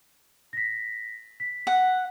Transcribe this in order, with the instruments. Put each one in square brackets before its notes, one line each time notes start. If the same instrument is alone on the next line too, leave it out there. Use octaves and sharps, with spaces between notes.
[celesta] A#6 B6
B6
[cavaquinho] F#5